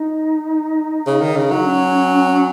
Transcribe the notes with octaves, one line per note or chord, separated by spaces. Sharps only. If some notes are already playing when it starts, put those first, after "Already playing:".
Already playing: D#4
C#3
D#3
C#3
F#3
C#4